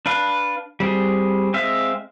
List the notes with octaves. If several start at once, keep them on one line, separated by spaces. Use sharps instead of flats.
D4 B4 F5
G3 C4 G#4
G#3 C4 E5 F5